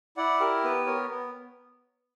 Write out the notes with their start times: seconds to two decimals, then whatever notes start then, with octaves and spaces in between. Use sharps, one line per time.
0.17 E4 D5 F#5
0.40 G4 A#4
0.64 B3 B4
0.86 B3 A#4 C#5
1.10 B3